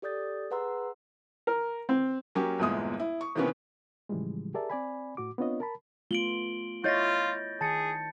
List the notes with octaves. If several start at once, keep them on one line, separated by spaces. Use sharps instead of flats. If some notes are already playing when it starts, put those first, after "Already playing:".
G4 A4 D5 D#6 G6 A6
G#4 B4 F#5 A#5 C6 E6
A#4
C4
F#3 A#3 C#4 G4
G1 E2 A#2 G#3 E4 D#6
E4
C#6
C3 D#3 E3 A#3 B3 C#4
A2 C#3 E3 F3 G3 G#3
G4 G#4 A#4 D5 E5 A5
C4 D5 G#5 B5
A2 F#4 D6
B3 C4 D4 F4 C#5 D#5
A#4 A5 B5
A3 B3 F4 D7 F#7 G7
E4 F4 C#5 D#5 G6 A6 A#6
D#3 G#4 A5 A6 C#7